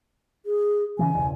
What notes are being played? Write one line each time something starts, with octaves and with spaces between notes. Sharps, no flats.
G#4
C#3 E3 F#3 G#5
E1 C#2